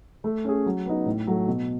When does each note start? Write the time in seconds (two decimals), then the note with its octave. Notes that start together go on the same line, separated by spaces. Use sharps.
0.24 A3
0.44 C#4 G#4
0.66 F#3
0.86 B3 D#4
1.06 A2
1.27 F#3 A3
1.48 B2